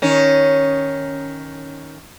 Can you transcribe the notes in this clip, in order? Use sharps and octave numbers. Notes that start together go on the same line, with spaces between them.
D#3 C#4